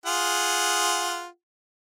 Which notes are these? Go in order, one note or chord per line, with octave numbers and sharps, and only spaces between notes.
F4 G#4 F#5